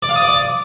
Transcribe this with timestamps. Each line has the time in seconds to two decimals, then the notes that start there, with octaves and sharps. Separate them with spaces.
0.03 D5
0.09 F5
0.16 D#6
0.22 D5
0.29 D6